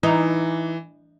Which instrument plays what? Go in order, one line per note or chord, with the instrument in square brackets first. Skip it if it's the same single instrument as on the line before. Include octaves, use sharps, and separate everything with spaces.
[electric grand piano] E3 [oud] D#4